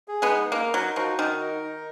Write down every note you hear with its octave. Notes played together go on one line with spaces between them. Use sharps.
G#4
G#3 B3
D#4
A#3 A#4
F#3 D#4
F3 F#4
D#3 D#4
A#4
D#4